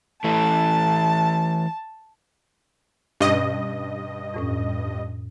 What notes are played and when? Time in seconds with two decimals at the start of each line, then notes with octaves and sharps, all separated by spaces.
0.24 E3 A3 A5
3.21 G2 B2 C#4 D#5
4.34 F2 A2 C#4